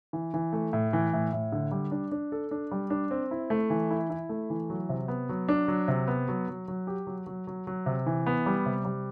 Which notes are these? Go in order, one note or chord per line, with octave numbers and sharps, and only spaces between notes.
E3
E3
A3
A2
E3
A2
A2
D3
G3
D4
D4
A4
D4
G3
D4
C4
E4
A3
E3
E4
E4
A3
E3
F#3
C3
B3
F#3
D4
F#3
C3
B3
F#3
F#3
F#3
G4
F#3
F#3
F#3
F#3
C3
E3
B3
G3
C3
G3